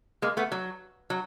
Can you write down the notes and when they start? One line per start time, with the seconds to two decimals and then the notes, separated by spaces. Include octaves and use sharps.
0.22 G#3 A#3
0.37 A3 B3
0.52 F#3
1.10 F#3